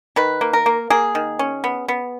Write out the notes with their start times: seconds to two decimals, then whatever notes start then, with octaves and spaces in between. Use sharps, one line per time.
0.16 D#3 B4
0.41 A#3
0.53 A#4
0.66 A#3
0.90 A#3 G#4
1.15 D#3
1.39 C#4
1.64 B3
1.88 B3